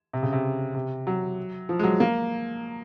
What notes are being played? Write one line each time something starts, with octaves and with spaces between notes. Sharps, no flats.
C3
C#3
C3
C3
F#3
F3
G#3
F#3
A#3